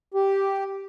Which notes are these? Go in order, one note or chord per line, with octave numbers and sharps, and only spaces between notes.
G4